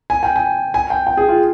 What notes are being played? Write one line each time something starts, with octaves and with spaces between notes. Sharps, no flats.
G#5
G5
G#5
G#5
G5
G5
G#4
F4